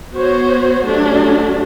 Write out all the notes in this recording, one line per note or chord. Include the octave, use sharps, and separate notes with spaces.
B3 F#4 C5 C#5
F#3 A3 D4 G4